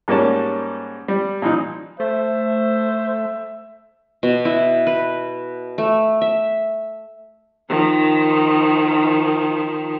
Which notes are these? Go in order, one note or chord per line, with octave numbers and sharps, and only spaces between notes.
G#2 G3 A#3 C#4 A5
G3
A#2 E3 F3 D#4
A3 C5 E5
B2
E4
B4
A3
E5
D#3 F3